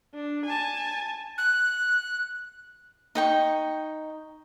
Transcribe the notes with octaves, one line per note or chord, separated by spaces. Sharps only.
D4
G#5 A5
F#6
D#4 G5 C#6